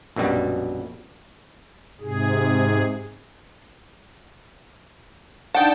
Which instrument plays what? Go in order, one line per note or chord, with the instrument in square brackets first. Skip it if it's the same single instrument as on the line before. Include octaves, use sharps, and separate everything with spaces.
[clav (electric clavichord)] A#1 F#2 B2 G3
[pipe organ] G#2 C3 G#4
[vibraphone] D4 D#4 D5 [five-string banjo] F#5 [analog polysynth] G5 A5